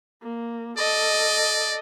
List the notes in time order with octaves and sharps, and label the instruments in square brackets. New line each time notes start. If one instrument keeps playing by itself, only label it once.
[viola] A#3
[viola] A4 D#5 [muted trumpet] D5